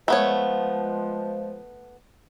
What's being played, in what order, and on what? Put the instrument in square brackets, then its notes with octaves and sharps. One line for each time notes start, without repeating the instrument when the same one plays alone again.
[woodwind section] F3 G#3 [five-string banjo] A3 B3 C#5